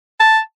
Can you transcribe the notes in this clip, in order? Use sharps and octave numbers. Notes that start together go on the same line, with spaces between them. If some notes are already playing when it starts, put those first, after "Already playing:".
A5